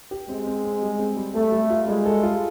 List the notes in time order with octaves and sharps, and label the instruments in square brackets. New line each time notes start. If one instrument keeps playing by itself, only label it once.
[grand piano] G4
[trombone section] G#3 [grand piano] C4
[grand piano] C4
C4
G3
C4
G3
[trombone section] A3 [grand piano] A4
[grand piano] G3
F4
[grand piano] G3 [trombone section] G#3
[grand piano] A4
F4